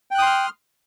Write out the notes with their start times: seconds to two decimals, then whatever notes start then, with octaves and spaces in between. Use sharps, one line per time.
0.11 G5
0.15 F#6
0.18 D#6
0.22 C6
0.26 F6